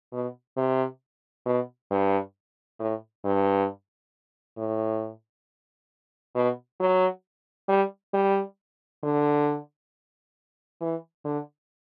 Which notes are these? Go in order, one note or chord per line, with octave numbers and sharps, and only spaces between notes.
B2
C3
B2
G2
A2
G2
A2
B2
F#3
G3
G3
D3
E3
D3